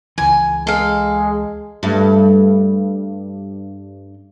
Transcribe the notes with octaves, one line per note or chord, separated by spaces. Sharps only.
C#2 E3 G#5
G#3 A4 F5
G2 A3